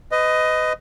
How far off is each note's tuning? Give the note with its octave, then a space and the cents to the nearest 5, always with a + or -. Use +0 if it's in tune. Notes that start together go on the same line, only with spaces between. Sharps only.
B4 +30 D#5 +5